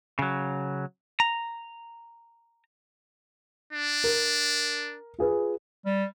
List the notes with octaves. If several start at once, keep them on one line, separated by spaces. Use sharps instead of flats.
C#3 F#3
A#5
D4
A#4
F4 G#4 B4
G3